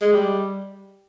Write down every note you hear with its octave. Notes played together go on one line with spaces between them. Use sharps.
G#3
G3